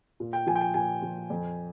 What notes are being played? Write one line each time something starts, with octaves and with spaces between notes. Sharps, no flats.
A#2
G5
F3 G#5
G5
G#5
A#2 G#5
F3
F2